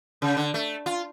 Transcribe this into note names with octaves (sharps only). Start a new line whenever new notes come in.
C#3
D3
A3
F4